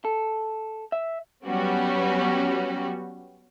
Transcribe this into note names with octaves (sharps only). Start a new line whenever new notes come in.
A4
E5
F#3 G3 B3 C#4 F#4 G4